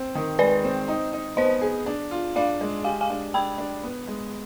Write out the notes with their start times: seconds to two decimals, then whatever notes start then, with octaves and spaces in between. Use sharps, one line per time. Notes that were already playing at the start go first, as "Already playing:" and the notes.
Already playing: C4
0.15 D#3
0.39 G#3 B4 D5
0.64 C4
0.88 D#4
1.13 D#4
1.37 B3 C5 D#5
1.62 G#4
1.86 D4
2.11 F4
2.36 D4 D5 F5
2.61 G#3
2.84 G4 F5 G#5
3.01 F5 G#5
3.10 D4
3.34 D4 G5 B5
3.58 D4
3.83 B3
4.08 G#3